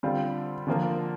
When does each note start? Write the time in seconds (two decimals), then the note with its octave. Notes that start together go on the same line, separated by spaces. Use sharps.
0.03 D3 G3 C4 F4
0.67 D3 F3 A#3 F4